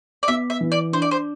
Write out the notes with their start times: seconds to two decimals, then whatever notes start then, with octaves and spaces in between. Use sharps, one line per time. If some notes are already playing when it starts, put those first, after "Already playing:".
0.23 D5
0.28 B3 E5
0.50 E5
0.61 E3
0.72 D5
0.92 D4 C5
1.02 D5
1.11 C5